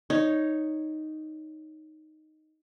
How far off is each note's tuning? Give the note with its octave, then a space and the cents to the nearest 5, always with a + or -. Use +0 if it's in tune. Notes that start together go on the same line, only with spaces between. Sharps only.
D#4 +0 C#5 +0